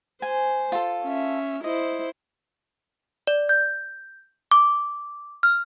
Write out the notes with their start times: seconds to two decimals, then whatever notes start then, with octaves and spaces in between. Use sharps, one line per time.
0.22 C5 G#5
0.72 F4 A4
1.03 C#4 E5
1.64 E4 C5 D#5
3.27 D5
3.49 G6
4.52 D6
5.43 F6